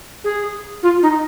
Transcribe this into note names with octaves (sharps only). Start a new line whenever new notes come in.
G#4
F4
D#4